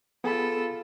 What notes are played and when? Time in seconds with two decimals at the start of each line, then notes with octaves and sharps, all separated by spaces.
0.24 B3 F4 G#4 A4 B5